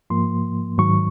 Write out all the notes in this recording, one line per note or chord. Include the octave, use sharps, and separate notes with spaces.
G#2 F3 A#3 C6
G#2 D#3 F#3 C#6